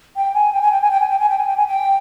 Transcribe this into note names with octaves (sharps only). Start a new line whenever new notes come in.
G5
G#5
G5
G#5
G5
G#5
G5
G#5
G5
G#5
G5
G#5
G5
G#5
G5